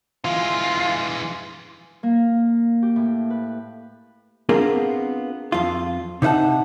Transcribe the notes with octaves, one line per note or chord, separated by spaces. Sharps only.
E3 G#3 F4
A#3
G4
A2
B4
B3 C4 D4 F4 G#4 A#4
F2 F4
C3 D#4 B4 F#5 A5